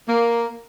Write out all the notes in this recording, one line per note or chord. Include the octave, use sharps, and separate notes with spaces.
A#3